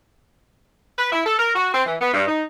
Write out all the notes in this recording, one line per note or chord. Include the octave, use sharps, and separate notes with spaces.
B4
E4
A4
A#4
F#4
C4
E3
B3
G2
D#4